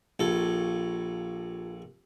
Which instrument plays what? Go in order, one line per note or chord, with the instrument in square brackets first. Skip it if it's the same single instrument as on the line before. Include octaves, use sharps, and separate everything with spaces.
[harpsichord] A#1 A4 [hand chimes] F4 G4 G#6